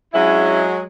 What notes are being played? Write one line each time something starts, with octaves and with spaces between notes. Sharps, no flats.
F#3 G#3 C#4 D4 E4